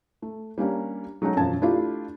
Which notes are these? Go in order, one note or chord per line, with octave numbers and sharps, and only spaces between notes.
A3
G3 A#3 C#4 D4
F#3 G#3 A3 C#4 D#4 F#4
E1 F#2 F3 A5 G#6
A3 D4 E4 F4 G4